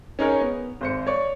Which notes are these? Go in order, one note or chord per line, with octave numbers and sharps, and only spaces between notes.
C#4 D#4 G#4 A#4 C#5
B3
G#1 C5 C#7
C#5 D5 C#6